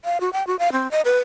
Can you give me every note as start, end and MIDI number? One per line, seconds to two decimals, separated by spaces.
0.05 0.20 77
0.20 0.30 66
0.33 0.45 79
0.47 0.56 66
0.59 0.72 77
0.72 0.90 60
0.91 1.01 75
1.05 1.18 71